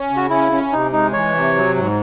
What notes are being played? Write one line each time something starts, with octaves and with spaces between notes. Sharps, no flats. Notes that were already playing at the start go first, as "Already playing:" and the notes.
Already playing: C#4
C#3
F#4
C#4 E4
C#4
C3 D#4
G#3 D#4
E3 C#5
C3
F#3
G#2